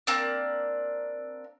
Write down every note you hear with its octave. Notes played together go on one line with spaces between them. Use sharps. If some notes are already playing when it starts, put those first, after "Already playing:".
A#3 C4 D4